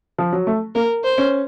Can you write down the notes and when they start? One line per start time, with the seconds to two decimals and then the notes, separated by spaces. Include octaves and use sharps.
0.18 F3
0.33 F#3
0.47 A3
0.75 A#3 A#4
1.04 C5
1.18 C#4